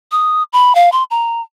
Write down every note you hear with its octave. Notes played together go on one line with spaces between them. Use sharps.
D#6
B5
F5
C6
A#5